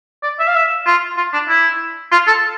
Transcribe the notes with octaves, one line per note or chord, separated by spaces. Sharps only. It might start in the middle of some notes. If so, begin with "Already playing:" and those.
D5
E5
F5
E5
F4
F4
D4
E4
F4
A4